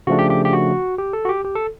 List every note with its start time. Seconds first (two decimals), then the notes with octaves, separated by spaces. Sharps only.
0.07 C#3 F3 A3 D4 F#4
0.19 G4
0.30 G4
0.45 G4
0.53 F#4
0.98 G4
1.13 A4
1.25 F#4
1.29 G4
1.44 G4
1.55 A4